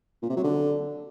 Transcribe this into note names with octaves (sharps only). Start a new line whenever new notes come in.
A#2
C3
F#3
D3